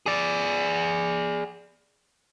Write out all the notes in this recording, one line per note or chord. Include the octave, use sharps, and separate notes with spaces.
G#4 D5